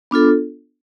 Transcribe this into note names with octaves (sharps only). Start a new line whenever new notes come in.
B3 D4 F4 A4